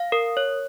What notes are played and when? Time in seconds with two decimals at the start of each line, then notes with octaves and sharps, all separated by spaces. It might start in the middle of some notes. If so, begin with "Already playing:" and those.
Already playing: F5
0.12 A#4
0.37 C#5